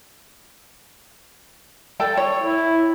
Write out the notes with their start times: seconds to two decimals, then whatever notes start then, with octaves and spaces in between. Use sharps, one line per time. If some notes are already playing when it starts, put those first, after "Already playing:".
2.00 A4 D5 G5
2.17 C#5
2.39 E4